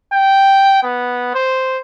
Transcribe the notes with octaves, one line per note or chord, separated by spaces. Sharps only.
G5
B3
C5